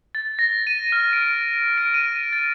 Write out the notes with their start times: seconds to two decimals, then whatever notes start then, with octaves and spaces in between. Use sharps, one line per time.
0.15 A6
0.39 A#6
0.67 D#7
0.92 F6
1.13 D7
1.78 D7
1.94 D#7
2.33 A6